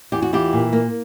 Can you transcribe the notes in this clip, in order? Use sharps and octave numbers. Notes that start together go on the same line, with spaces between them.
E2 G4
F#4
E3 F4 G4
A#2
A#3